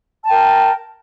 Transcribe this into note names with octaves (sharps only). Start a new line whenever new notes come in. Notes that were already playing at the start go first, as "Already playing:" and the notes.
A#4 G5 A5